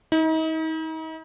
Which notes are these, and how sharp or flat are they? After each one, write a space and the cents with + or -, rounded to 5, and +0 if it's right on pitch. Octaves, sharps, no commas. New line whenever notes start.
D#4 +40